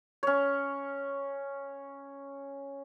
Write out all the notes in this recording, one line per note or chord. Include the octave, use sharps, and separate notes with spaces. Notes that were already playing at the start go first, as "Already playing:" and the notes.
C#4 C#5